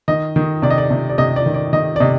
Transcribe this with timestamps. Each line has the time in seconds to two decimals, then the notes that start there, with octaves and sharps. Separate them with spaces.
0.08 D#3 D#5
0.36 D#3
0.62 C3 D5
0.70 D#5
0.78 D5
0.91 C3
1.10 D5
1.18 C3 D#5
1.36 D5
1.46 D#3
1.54 D5
1.73 D#3 D#5
1.96 D5
2.00 C3 D#5